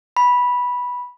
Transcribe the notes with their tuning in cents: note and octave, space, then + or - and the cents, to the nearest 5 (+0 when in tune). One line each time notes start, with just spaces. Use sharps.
B5 -10